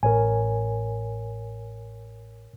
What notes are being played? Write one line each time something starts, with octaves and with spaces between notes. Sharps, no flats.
A1 A#4 C#5 G#5